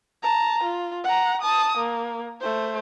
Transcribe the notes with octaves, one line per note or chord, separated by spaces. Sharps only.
A5 A#5
F4
F#5 A#5
A5 D#6
A#3
A3 C5